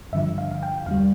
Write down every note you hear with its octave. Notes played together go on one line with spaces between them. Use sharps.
G2 D3 F3 E5
F5
F5
G5
E2 D3 G3 F5